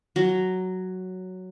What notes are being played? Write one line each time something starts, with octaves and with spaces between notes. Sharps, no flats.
F#3